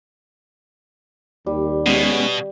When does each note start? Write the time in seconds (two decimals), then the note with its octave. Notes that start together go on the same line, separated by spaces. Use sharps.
1.46 D#2 G3
1.86 B2 G#3 B3 C#4